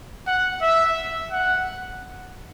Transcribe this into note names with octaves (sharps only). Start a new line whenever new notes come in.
F#5
E5
F#5